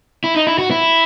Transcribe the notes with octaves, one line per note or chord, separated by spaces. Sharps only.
E4
D#4
E4
F#4
E4